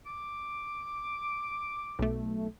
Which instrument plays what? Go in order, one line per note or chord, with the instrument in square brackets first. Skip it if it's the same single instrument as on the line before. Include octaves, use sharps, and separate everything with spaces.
[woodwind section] D6
[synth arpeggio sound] B1 A3